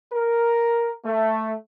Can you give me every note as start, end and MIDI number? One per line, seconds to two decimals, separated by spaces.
0.13 0.91 70
1.05 1.54 57